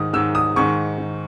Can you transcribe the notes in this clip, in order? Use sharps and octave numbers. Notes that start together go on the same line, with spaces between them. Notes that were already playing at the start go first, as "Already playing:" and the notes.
Already playing: G#2 D#3 D#6
G#2 D#3 E6
D#6
G#2 D#3 C#6
D#3